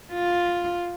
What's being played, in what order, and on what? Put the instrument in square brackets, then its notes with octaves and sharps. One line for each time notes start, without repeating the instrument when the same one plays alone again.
[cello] F4